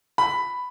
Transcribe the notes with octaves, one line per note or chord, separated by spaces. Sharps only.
B5